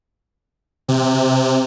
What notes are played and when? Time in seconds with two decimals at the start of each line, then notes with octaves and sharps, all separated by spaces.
0.88 C3